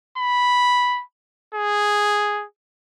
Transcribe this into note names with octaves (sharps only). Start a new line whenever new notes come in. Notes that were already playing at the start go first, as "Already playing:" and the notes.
B5
G#4